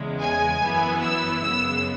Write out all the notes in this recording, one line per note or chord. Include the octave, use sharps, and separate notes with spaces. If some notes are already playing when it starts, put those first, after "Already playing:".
Already playing: E2 C#3 G#3
G#5
F#2 E3 B3 E4
E6
F#2 C#3 G#3 B3 E6